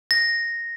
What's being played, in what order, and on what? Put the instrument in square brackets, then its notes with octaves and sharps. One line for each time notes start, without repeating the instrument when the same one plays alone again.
[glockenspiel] A#6